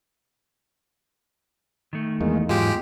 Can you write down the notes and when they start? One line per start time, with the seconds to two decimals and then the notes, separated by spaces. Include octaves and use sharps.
1.93 D#3 A3
2.21 E2 G#3 A#3
2.49 G#2 F#3 G#3 A#3 F4 G4